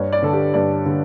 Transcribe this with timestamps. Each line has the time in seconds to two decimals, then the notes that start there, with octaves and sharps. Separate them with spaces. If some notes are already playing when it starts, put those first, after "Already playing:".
Already playing: G2 C#5
0.13 D5
0.22 D3 A4
0.33 G4
0.54 G2 D5
0.86 D3